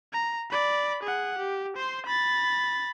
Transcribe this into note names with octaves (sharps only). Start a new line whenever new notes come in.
A#5
D5 B5
G#4 F#5
G4
C5 C6
B5 A6